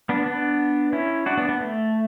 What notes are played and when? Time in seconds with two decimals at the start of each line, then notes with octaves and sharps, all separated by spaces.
0.09 B3 D4
0.26 B3 D4
0.93 C#4 E4
1.26 D4 F#4
1.37 B3 D4
1.49 B3
1.60 A3